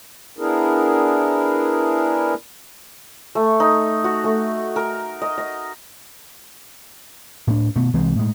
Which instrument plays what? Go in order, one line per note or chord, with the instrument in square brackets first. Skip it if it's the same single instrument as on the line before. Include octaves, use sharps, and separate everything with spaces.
[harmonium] B3 D4 E4 G#4 A#4
[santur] A3
D#4
F#4
A3
A#4
D#5
D#5
[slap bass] A2 D4
B2 A3
C2 E3 G#3 C4
A2 G#3